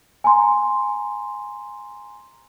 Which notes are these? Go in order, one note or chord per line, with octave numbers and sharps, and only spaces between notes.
G#5 A#5 C6